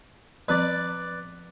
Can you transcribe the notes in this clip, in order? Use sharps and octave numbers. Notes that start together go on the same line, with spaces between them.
F3 C4 B4 D5